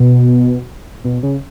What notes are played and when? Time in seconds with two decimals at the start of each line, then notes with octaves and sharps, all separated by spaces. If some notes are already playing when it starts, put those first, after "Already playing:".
Already playing: B2
1.05 B2
1.23 C#3